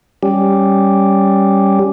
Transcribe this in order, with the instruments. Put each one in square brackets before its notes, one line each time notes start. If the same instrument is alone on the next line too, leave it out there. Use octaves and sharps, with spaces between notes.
[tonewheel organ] G3 C#4 G4